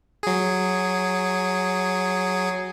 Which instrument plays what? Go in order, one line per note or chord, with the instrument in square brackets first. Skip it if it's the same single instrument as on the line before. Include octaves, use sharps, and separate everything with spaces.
[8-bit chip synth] F#3 G#4